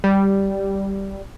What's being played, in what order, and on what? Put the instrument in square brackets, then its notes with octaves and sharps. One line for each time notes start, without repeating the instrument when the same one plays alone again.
[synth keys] G3